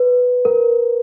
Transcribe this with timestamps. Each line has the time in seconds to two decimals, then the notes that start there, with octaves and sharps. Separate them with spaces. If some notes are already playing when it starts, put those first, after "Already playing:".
Already playing: B4
0.45 A#4